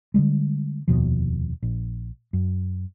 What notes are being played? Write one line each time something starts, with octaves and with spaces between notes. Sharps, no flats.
D3 E3 G3 G#3
F1 D#2 B2 F3
A#1
F#2